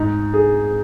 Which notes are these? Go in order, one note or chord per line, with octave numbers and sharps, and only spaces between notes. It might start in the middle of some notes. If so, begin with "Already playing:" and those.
Already playing: G#2 D#4
G#4